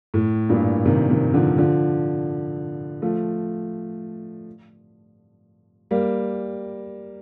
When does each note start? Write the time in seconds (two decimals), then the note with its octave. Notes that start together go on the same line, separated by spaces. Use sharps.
0.14 A2
0.49 G2 A#2
0.85 C3 D#3
1.10 C3 D#3
1.34 D3 F3
1.58 D3 F3
3.02 F3 A3
5.91 G3 A#3